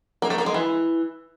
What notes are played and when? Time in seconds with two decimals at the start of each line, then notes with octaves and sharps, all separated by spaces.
0.22 A#3
0.30 A3
0.38 A#3
0.46 G#3
0.54 E3